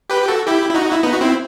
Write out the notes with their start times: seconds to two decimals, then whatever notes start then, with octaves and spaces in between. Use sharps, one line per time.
0.10 G4 B4
0.22 G4
0.28 F#4 A4
0.47 E4 G4
0.70 E4
0.75 D#4 F#4
0.92 E4
1.03 B3 D#4
1.13 F#4
1.21 C4 E4